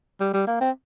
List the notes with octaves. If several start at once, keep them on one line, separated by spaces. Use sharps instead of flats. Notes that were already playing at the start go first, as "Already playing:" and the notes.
G3
G3
A#3
C4